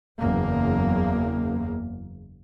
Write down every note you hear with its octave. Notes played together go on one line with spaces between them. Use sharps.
F#1 E2 A#3